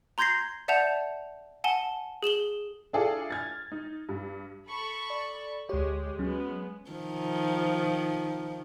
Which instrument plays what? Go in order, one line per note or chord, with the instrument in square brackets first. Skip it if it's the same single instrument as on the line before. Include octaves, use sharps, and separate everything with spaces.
[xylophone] A#5 C6 G6 G#6 A#6 C7
D5 E5 F#5 A5 G6 F7
F#5 G#5 A5 G7
G#4 E7 F#7 G7
[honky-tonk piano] D4 E4 F4 G#4 A4 D5
F6 G#6 A6
D#4
G2
[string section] A4 B5 C#6
[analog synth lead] D5
[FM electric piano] D2 C#5 [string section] G#3 [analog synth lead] G4
[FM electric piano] F#3 [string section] G#3 B3 [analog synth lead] C#4
[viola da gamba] D#3 F3